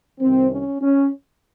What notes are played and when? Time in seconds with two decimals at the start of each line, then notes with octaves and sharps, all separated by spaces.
0.20 C2 C3 D#3 C4
0.51 C#4
0.81 C#4